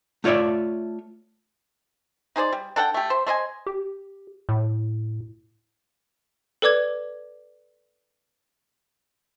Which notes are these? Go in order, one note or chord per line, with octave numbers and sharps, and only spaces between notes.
A3 F4 C#5 D5 E5
D#4 G#4 C5 D5
G3
D4 A4 F#5 G5
A3 G4
C5
A3 C5 D#5 G#5
G4
A2
A4 B4 D5 D6 G#6